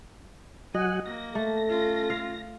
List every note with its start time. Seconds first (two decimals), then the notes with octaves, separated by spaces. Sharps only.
0.75 F#3 D#5 F#5 G#5
1.06 A#3 A#6
1.35 A3 A4
1.68 C#4 F4
2.10 F5